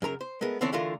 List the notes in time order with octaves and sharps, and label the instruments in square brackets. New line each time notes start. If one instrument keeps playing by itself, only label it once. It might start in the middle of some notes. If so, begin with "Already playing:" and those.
[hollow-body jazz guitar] F#2 C#3 A#4 A#5
C5
G#3 A3 B3 A#4
D3 E3 C4 D4 C#5 D5
D3 E3 A3 F4 A#4